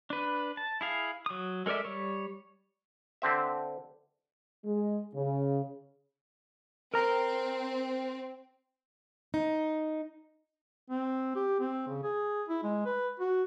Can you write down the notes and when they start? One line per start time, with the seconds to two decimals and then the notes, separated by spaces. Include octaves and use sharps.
0.10 D4 B4
0.57 A5
0.81 E4 G#4 F5
1.26 F#3 D#6
1.66 G#3 A4 A#4 D5 E5
1.84 G3 C#5
3.22 D3 C4 E5
4.64 G#3
5.14 C#3
6.94 C4 A#4 A#5
9.34 D#4
10.90 C4
11.35 G4
11.59 C4
11.87 C#3
12.03 G#4
12.48 E4
12.63 G#3
12.86 B4
13.20 F#4